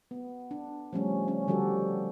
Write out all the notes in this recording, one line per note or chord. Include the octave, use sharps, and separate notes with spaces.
B3
D4
F3 G3 A3 C#4
C#4
D3 F3 G3 F#4 G4 A4